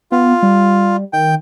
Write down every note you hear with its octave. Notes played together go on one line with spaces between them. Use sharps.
B3 F4
G3
D#3 G5